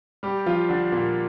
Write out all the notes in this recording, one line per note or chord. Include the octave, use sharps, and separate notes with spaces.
G3 G4
F3 F4
D3 D4
A#2 A#3